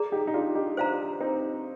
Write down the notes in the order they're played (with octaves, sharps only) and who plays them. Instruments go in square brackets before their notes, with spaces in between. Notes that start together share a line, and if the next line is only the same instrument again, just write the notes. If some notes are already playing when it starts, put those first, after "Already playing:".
Already playing: [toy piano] G#4 D5 A#5
[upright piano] D#4 G4
D#4
D4 F4
D#4 G4
[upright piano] D4 F4 [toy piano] C5 F5 A#5
[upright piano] C4 D#4